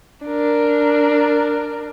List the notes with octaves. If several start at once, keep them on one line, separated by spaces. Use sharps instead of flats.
D4 A#4